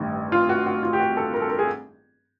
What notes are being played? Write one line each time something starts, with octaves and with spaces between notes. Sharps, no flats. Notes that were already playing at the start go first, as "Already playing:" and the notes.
Already playing: A1 G2 D#3
F4
F#4
F#4
F4
G4
F#4
A4
A#4
A4
A#4
G#4